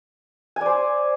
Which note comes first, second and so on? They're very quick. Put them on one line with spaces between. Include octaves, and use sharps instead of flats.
G#5 D5 C5